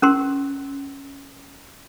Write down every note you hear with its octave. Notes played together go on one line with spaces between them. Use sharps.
C#4 A#4 C6